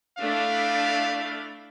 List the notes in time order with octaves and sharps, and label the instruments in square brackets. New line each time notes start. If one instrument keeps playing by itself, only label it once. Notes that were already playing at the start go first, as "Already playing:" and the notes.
[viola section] A3 D4 E4 [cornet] F5